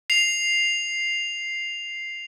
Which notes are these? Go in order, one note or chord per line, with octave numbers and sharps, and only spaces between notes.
C7 F7